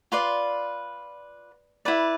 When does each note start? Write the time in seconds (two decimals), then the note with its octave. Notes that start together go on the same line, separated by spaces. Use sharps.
0.12 F4 B4 D5 C6
1.85 E4 B4 D5